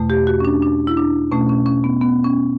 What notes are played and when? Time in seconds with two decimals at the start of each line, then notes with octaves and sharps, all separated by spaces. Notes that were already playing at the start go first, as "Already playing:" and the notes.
Already playing: E2 B2 A3
0.10 G4
0.27 F#4
0.40 C#4
0.45 D4
0.62 D4
0.87 E4
0.97 D4
1.32 B2 A3 C#4
1.49 C#4
1.66 C#4
1.84 B3
2.01 B3
2.24 C#4